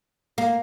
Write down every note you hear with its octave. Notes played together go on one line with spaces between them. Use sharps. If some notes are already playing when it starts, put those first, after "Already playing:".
A#3